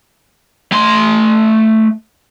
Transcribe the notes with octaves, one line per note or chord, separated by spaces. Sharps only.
A3 C6